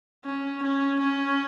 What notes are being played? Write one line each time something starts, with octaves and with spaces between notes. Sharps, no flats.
C#4
C#4
C#4